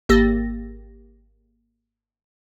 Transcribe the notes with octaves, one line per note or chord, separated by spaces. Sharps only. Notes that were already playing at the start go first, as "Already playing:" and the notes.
G#1 A#3 G4 E6 A6 A#6